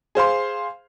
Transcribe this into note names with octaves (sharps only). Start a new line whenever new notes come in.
G#4 C5 F5 C6